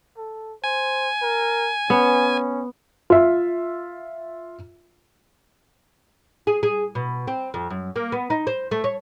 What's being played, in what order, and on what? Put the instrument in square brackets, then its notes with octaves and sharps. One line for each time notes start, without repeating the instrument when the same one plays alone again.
[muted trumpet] A4
[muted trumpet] C5 [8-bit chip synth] G#5
[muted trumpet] A#4
[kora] B3 [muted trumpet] C#4
[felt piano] F4 E5
[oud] G#4
G#4
B2
C4
F2
F#2
A#3
B3
D#4
C5
A3
C#5